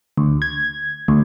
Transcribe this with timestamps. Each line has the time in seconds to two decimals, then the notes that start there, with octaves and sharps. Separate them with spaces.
0.17 D2
0.42 G#6
1.08 D2